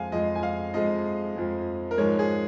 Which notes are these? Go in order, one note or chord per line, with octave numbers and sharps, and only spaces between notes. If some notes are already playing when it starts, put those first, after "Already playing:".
Already playing: F2 F3 G#3 F5 G#5
F2 F3 G#3 D#5
G#5
F5
F2 F3 G#3 D#5
F2 F3 G#3
A#4
G#2 F3 G#3 C#5
G#4